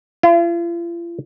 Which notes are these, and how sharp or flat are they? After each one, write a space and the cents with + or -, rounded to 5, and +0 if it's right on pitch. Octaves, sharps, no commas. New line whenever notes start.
F4 -45